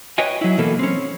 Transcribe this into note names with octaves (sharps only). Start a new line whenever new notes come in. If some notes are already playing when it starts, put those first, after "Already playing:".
B4 C#5 D#5 G5 G#5
F#3 E4
B2 E3 A#3 A4
C4 C#4